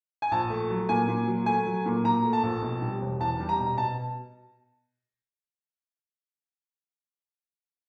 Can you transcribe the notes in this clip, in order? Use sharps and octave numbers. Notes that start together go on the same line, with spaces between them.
G#5
A#1 A5
A3
F#3
A#2 G#5
A#2
F#3
A3 G#5
F#3
A#2
A#2 A#5
A3
A5
A#1
B2
G3
E1
E2 A5
G3
A#5
B2
B2 A5